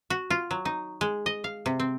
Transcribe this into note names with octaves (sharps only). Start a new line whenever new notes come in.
F#4
F4
F#3
D#4
G#3
D#5
F5
C3
C4